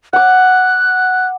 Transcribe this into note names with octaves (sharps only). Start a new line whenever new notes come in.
F#5 D6 F#6